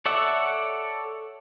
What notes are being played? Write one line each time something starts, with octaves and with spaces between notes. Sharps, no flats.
A4 C#5 D5 E5 F#5